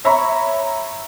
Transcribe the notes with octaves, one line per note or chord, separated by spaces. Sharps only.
C#5 E5 A#5 B5 C#6